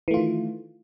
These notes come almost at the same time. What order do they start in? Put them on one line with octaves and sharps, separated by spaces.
E3 A3 F4 D#3